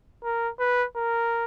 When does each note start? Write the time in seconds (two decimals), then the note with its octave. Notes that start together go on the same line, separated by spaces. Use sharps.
0.24 A#4
0.59 B4
0.96 A#4